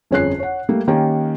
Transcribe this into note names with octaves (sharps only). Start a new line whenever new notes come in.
G1 F2 C#4 G#4 F#6 C7
C#5 F#5
G3 A3 A#3
D#3 A#3 C#4 G4